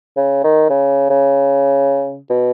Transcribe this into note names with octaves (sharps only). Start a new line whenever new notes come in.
C#3
D#3
C#3
C#3
B2